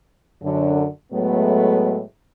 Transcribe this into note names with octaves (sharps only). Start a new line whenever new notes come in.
F#2 D3
A2 F#3 G#3 A3 B3